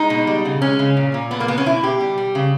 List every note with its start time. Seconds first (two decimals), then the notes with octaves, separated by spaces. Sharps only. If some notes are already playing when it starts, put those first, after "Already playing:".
Already playing: G#3 D#4
0.10 B2
0.27 G3
0.45 C#3
0.62 G#3 C#4
0.79 C#3
0.97 A#2
1.14 A#2
1.31 B2 B3
1.40 A#3
1.48 B2 B3
1.58 C#4
1.66 B2 E4
1.83 B2 G4
2.00 G3
2.18 G3
2.35 C#3